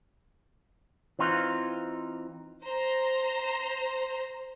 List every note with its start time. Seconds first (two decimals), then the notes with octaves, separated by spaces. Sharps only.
1.19 E3 C4 D#4 F4
2.63 C5 A#5